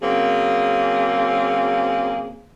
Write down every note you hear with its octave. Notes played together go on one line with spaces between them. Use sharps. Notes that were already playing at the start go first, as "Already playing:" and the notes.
C#3 F#3 A#3 C4 G#4